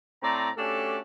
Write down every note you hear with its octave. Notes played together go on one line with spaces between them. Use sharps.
A2 C4 D5 A#5
A3 C#4 D4 F#4 G4 A4